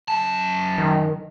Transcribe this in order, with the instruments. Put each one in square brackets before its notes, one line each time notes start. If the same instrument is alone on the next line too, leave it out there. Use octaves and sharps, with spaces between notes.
[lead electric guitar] F#2 A5
[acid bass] D#3